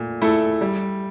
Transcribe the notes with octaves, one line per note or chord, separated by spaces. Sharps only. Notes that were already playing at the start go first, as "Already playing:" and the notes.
Already playing: A#2 A3
A3 E4 A4
G3